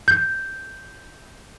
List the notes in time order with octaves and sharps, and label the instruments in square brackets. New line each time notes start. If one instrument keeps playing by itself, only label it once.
[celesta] G6